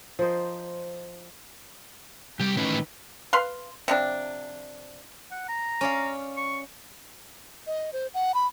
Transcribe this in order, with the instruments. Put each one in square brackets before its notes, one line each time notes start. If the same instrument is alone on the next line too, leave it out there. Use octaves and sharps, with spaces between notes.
[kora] F3 A#4 C5 D#5
[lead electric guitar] C2 G3 [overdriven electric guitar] G4 G5
[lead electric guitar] A2 C#4 [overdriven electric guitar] D#3 B4
[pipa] B4 F5 C6
C3 F3 D4
[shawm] F#5
A#5
[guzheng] C#4 D5 F5
[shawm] C#6
[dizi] D#5
C5
F#5
B5